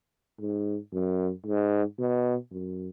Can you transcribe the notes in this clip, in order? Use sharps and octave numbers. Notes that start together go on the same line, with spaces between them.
G#2
F#2
G#2
B2
F#2